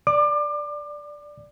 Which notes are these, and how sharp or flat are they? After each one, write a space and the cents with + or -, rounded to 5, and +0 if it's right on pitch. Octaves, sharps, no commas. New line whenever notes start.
D5 +0 D6 +30